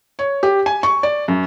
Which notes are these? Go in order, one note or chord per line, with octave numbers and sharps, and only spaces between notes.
C#5
G4
G#5
C#6
D5
F#2